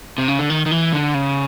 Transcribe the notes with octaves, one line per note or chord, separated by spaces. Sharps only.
C3
C#3
D3
D#3
D#3
E3
D3
C#3